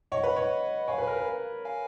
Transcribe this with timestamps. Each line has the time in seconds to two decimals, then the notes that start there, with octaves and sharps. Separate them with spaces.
0.12 C#5 D#5 F#5
0.23 B4
0.36 C#5
0.88 C#5 F5 G#5
0.98 B4
1.07 A#4
1.16 B4
1.65 F5 G#5